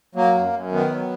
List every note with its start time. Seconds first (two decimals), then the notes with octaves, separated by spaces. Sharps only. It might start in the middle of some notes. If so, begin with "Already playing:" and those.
0.15 F#3 A#3
0.35 F#2
0.53 F#2
0.72 D#3 B3
0.90 F#3